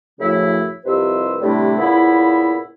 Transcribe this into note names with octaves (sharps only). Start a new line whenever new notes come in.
F#2 A2 C#3 F3 A3 E4
C2 F2 C3 B4 C5 E6
A2 C3 G3 A3 D4 E4
A#2 C#3 B3 E4